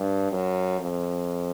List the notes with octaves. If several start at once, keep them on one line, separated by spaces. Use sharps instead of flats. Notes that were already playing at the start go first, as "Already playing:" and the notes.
Already playing: G2
F#2
F2